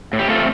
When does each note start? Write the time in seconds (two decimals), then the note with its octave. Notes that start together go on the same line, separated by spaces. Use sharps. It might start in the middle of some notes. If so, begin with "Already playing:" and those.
0.13 A2
0.19 G4
0.29 A3 C4 F4 A4